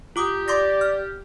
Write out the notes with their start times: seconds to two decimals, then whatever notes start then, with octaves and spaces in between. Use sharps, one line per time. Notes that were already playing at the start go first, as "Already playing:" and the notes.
0.16 F4 G4 D6 D#6
0.48 D5 C6 D6 A#6
0.81 F6